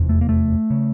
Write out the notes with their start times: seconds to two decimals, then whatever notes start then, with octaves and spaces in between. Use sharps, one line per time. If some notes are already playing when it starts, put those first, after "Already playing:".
Already playing: F1 E2 C3
0.09 A3
0.21 A#3
0.29 A3
0.70 C#3